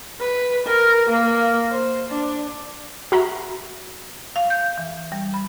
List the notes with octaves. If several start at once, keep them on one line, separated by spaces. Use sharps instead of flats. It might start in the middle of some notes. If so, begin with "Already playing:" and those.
B4
A#4
A#3
C5
D4
F#4 E5 A#5 B5
F5
G6
E3
G3
B5